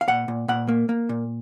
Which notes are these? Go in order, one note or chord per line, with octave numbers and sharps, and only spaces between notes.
F5
A#2 F#5
A#2
A#2 F#5
A#3
A#3
A#2